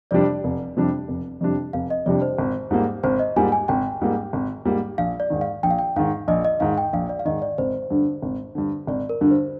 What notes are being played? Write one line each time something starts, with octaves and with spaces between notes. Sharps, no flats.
F2 C3 G3 D4 D5
F1
F2 C3 G3 D4
F1
F2 C3 G3 D4
F1 F5
D#5
F2 C3 G3 D4 D5
C5
G#1
G#2 G3 A#3
G#1 C5
D#5
G#2 G3 A#3 G#5
G#5
G#1 G5
G#2 G3 A#3
G#1
G#2 G3 A#3
A#1 F5
D5
G#2 D#3
F5
A#1 G5
F5
G5
G#2 D#3 F5
A#1 D#5
D#5
G#2 D#3 F5
G5
A#1 F5
D5
F5
G#2 D#3 D#5
D5
G#1 C5
G2 D3
G#1
G2 D3
G#1 D5
A#4
G2 D3
C5